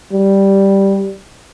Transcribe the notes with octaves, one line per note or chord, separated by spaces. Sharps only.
G3